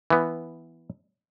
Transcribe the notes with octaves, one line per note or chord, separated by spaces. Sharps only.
E3 B3